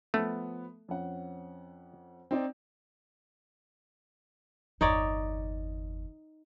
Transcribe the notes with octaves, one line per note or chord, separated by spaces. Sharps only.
F3 A3 B3
F2 C#4 F#5
C4 D#4 D5
G1 E2 D#4 C#5 D5